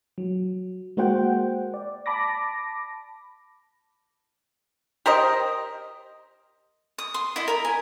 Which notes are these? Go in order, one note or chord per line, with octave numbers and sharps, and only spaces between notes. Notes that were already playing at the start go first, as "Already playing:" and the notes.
F#3
G#3 A#3 F#4 C5 F#5 G5
D5
A5 B5 D6 A#6
G4 A#4 C5 D#5
D#6
C6
E4 D#5
A#4 B5
G#5